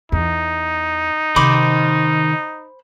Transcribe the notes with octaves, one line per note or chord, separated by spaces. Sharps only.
E2 D#4
C3 D#3 C5 B5 D6